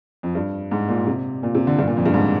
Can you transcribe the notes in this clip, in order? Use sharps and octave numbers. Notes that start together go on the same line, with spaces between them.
F2
G2
G#2
A#2
C3
A#2
C3
D3
G2
A#2
F2
G2
G#2